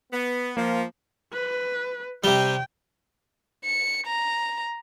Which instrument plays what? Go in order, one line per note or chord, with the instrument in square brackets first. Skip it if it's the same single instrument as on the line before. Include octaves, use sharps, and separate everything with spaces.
[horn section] B3
[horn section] F3 [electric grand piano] A#3
[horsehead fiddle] B4
[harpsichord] C3 G3 [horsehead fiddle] G5
[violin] C#7
A#5